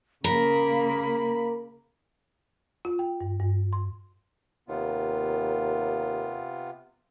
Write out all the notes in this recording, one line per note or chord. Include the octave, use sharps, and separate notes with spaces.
C#3 A#3 A#4 B5
F4
G5
G2
G2
C6
D#2 C3 B3 F4